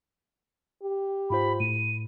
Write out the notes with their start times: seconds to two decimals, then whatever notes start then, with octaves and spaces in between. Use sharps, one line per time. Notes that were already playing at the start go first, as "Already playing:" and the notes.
0.83 G4
1.30 G#2 F4 C5 B5
1.60 A2 D#7